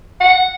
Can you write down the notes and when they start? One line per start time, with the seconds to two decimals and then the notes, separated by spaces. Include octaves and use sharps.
0.20 F#5